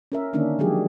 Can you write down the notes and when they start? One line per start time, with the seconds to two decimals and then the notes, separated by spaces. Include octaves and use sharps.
0.12 C#4 A#4 E5
0.33 D3 D#3 A#3 C#4 D4
0.59 D#3 F3 F#3 G#3 G4 G#4